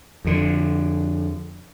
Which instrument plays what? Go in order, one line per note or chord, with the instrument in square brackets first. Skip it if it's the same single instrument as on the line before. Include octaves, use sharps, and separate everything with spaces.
[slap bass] F2 D3